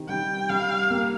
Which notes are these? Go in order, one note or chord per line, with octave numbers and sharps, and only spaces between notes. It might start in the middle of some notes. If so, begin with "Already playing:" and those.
Already playing: C3 D#3
G3 G5
G3 F5
A#3